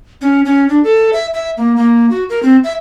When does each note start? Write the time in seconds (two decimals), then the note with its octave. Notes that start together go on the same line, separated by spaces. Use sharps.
0.21 C#4
0.45 C#4
0.69 D4
0.84 A4
1.13 E5
1.34 E5
1.57 A#3
1.76 A#3
2.10 F#4
2.30 A#4
2.43 C4
2.64 E5